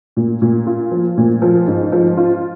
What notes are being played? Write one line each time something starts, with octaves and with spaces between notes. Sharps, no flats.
A#2
A#2
F4
F3
A#2
F3
G#2
F3
F4